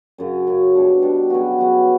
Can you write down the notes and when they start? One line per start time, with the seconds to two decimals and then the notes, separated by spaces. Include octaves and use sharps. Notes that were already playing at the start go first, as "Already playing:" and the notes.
0.18 F#2 C#3 F#3
0.47 F#2 C#3 F#3
0.75 B2 G3 D4
1.02 B2 G3 D4
1.30 C#3 F#3 B3 F#4
1.58 C#3 F#3 B3 F#4